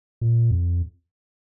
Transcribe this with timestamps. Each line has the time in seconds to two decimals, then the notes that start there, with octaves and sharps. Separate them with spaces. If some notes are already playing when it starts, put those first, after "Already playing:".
0.21 A#2
0.51 F2